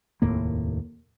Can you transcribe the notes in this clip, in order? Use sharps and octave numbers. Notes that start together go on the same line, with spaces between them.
F1 D#2 A2 A#3